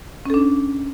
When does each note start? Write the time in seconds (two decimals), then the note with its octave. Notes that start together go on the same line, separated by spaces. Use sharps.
0.26 C#4
0.30 A4
0.34 D4